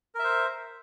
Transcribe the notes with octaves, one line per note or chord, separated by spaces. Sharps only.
A#4 C5 E5